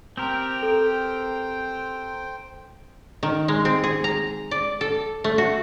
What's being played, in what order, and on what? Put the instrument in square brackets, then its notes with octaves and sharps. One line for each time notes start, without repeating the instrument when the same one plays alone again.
[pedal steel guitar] C4 G4 A#4 [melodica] C5 G5
[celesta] A4
[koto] D#3
G#3
C4
G#4
A#5
D5
A4
A3
F#4